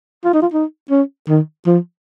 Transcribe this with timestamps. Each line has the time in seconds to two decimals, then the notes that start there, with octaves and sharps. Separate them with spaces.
0.25 F4
0.33 D#4
0.42 F4
0.53 D#4
0.91 C#4
1.29 D#3
1.66 F3